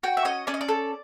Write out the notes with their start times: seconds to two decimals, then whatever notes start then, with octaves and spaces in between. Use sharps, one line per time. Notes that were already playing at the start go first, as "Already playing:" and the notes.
0.03 F#4 G5
0.17 E5
0.25 C#4 D#5
0.47 C#4 D5
0.54 D#5
0.61 D5
0.69 A4